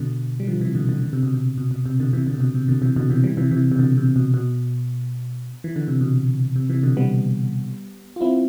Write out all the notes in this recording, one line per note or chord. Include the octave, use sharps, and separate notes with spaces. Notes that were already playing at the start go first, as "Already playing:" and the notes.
Already playing: B2 D3
G3
D3 F3
C3 E3
B2 D3
B2 D3
D3
C3
B2
C3
B2
B2
C3
B2 D3
C3 E3
B2 D3
C3
B2
C3
B2 D3
C3 E3
B2 D3
C3 E3
E3 G3
C3 E3
C3 E3
C3
B2 D3
C3
B2
B2
E3
D3
C3
B2
C3
C3 E3
B2 D3
G3 B3
F4
C4 E4